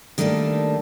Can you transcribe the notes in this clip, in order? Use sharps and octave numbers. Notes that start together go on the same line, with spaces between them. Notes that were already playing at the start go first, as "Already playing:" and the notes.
D#3 G3 A3 A#3 D4 A4